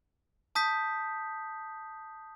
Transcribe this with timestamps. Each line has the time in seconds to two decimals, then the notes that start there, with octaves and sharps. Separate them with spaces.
0.55 A5 D#6 G6 B6